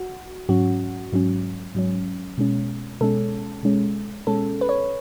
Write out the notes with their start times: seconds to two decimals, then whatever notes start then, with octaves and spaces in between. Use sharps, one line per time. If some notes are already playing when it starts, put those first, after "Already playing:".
Already playing: F#4
0.49 G#2 F#3 C#4 F#4
1.13 G#2 F#3 C#4
1.75 G#2 F#3 C#4
2.38 B2 G#3 C#4
3.01 B2 G#3 C#4 A4
3.63 B2 G#3 C#4
4.27 B2 G#3 C#4 A4
4.61 B4
4.69 C#5